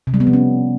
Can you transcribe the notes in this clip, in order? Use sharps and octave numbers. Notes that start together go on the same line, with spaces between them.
C3
G3
B3
F3
C#4